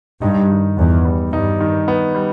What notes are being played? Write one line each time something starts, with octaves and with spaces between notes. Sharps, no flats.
G2 D#4
D#3
E2 B3
G3
G2 D#4
D#3
B3
G3